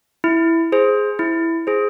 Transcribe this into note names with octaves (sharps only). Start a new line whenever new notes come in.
E4
G#4 C5
E4
G#4 C5